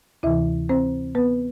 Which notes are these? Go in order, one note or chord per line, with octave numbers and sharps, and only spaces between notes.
D2 C3 E3 E4 E5
C4 C5
B3 B4